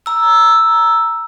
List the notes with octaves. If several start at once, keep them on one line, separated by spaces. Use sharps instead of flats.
A#5 E6